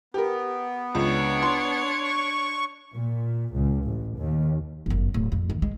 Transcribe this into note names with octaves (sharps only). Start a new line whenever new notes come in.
B3 G4 A#4
C#2 D4 C#5
C6
C#6
A#2
C#2
A1
D#2
G1 F#2
D1
F2
D#3
G#3